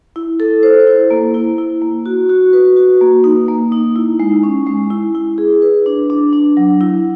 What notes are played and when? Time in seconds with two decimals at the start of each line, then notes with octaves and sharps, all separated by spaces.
0.16 E4
0.40 A4
0.63 C5
0.87 E4
1.11 A#3
1.34 E4
1.58 E4
1.82 A#3
2.06 F#4
2.29 F#4
2.53 B4
2.76 F#4
3.01 A#3
3.24 D#4
3.48 A#3
3.72 D#4
3.96 E4
4.20 G#3
4.43 C#4
4.67 G#3
4.91 E4
5.15 E4
5.38 G#4
5.62 B4
5.86 D4
6.10 D4
6.33 D4
6.57 F#3
6.81 E4